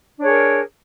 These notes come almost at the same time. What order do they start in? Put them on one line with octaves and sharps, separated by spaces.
D4 C#5 G#4 A#4